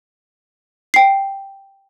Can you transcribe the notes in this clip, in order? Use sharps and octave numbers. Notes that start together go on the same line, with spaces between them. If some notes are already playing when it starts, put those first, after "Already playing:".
G5 C7